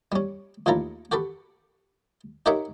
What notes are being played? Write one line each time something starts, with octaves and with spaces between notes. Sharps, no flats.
G3 C#4
D#2 A2 E4 F4 A4 A#5
F#4 G4 A4 B4
D#4 G4 A#4 C#5 E5 F#5